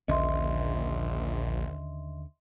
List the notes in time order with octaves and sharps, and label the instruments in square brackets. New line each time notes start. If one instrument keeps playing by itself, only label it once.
[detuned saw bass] A#1 [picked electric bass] D#2 D3 C#4 [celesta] D#5 E5 C6